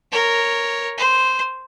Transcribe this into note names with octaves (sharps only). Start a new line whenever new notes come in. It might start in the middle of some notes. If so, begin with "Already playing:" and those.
A#4 C#5
C5